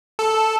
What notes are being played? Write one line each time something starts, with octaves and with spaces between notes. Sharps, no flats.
A4